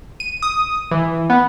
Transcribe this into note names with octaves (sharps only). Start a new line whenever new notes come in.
D#7
D#6
E3
B3